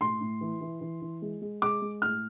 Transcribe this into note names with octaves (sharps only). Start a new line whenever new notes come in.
A2 C6
A2
E3
E3
E3
E3
G#3
G#3
G#3 D6
G#3
A2 F6